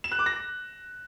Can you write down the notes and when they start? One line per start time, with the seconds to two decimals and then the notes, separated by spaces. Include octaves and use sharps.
0.04 E7
0.12 F#6
0.19 D6
0.26 A#6